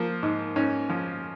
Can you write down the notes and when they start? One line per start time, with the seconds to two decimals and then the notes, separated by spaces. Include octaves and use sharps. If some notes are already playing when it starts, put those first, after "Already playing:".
Already playing: F3 A#3
0.23 G#2
0.56 G#2 C#4
0.90 F3